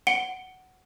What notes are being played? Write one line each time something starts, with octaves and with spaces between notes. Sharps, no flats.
F#5 C#7 D7 G7